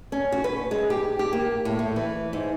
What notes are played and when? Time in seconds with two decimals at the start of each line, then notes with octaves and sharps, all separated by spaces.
0.12 C#4
0.32 F#4
0.44 B4
0.71 G#3
0.90 G4
1.19 G4
1.33 A#3
1.65 A2
1.79 A3
1.96 E3
2.33 G#2